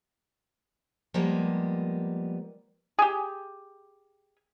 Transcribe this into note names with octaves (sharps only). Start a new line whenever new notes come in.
F3 G3 G#3 A#3 B3
G4 G#4